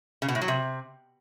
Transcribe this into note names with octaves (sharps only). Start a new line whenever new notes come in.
C#3
B2
A2
F#3
C3